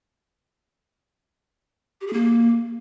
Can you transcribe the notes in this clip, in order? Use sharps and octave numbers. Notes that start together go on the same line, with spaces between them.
G4
G#4
A#3